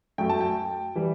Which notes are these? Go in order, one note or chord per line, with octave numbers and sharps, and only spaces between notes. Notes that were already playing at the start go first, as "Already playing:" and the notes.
F#2 F#3 A3 G5
A5
G5
E3 G3